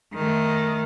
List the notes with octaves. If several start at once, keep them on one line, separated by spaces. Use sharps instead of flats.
D#3 A3